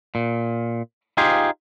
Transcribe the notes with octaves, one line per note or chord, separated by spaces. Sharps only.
A#2
D#4 F4 G4 G#4 C5 F5